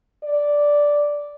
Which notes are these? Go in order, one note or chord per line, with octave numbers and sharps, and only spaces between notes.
D5